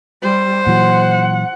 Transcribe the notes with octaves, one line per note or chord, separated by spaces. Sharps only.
G3 C5
A#2 E3 F#3 F#5